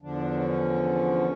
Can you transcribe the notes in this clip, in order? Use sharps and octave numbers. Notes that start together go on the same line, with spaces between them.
E2 D3 F3 D4
C#4